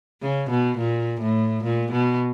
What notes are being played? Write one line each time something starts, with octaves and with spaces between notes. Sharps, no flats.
C#3
B2
A#2
A2
A#2
B2